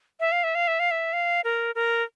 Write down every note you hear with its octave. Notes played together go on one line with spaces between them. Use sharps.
E5
F5
E5
F5
E5
F5
E5
F5
A#4
A#4